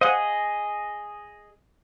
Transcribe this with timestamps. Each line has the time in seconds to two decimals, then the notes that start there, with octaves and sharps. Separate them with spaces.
0.01 G#4 C5 D#5 F5 F#5